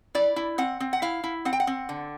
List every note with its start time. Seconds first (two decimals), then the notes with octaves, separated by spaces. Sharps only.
0.15 E4 D5
0.36 E4
0.58 C4 F#5
0.80 C4
0.93 F#5
1.02 E4 F5
1.24 E4
1.45 C4 F#5
1.53 G5
1.60 F#5
1.67 C4
1.89 D3